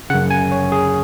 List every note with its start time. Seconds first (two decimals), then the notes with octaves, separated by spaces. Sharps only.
0.10 F#2 C#3 F#5
0.30 G#5
0.52 C#5
0.72 G#4